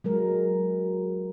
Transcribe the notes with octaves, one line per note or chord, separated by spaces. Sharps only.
F#3 G#3 A#4